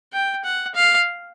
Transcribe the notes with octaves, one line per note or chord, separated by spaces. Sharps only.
G5
F#5
F5